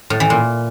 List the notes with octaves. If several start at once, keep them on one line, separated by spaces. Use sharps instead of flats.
A2
E3
A#2